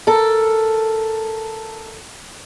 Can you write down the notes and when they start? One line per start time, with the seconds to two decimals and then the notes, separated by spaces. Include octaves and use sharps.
0.07 A4 A#4